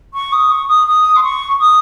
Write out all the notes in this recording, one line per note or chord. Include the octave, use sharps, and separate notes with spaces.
C#6
D#6
C#6
D#6
D#6
C6
C#6
D#6